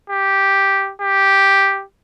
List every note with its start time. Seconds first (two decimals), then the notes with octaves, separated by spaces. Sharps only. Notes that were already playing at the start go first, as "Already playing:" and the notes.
0.10 G4
1.01 G4